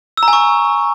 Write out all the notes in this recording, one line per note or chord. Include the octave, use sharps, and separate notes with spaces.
E6
A#5
G#5
C#6